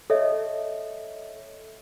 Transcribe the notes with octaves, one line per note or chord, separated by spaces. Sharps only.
A4 C#5 D#5 E5